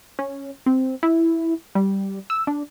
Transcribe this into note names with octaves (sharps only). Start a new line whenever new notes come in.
C#4
C4
E4
G3
E6
D4